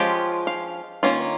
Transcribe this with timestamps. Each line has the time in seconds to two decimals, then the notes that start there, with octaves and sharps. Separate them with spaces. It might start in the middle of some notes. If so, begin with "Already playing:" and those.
Already playing: F3 G#3 C#4 F4 G4
0.47 F5
1.03 D#3 A#3 C#4 F4